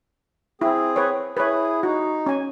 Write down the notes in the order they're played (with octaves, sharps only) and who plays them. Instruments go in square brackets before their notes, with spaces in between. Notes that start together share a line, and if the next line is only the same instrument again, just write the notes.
[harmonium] C4 G#4 [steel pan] E4
[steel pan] B4 C#5
[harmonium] E4 G#4 [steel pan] B4 C#5
[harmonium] D#4 [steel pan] F#4
[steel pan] C#4 G#5